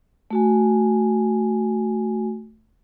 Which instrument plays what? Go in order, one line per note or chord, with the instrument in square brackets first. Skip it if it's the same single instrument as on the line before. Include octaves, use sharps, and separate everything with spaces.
[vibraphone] A3 F#4 G#5